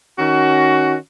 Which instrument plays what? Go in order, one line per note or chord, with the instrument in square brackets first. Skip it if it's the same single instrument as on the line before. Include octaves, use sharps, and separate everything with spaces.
[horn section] D#3 C#4 F#4